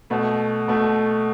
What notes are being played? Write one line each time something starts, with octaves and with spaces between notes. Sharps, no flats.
B2 A3
B2 A3